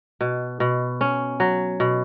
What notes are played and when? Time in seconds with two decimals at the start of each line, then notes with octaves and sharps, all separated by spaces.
0.21 B2
0.60 B2
1.01 C#4
1.40 F#3
1.80 B2